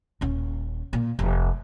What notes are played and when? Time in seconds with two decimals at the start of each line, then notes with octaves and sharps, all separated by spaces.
0.21 D#1 C#4
0.93 A#2
1.19 F1